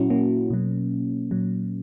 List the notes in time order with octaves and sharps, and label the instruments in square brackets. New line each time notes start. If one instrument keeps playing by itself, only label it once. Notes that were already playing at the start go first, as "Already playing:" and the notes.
Already playing: [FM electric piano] A#2 F#3 C#4 E4 F#4
A#3 C#4
B2 F#3
A#2 F#3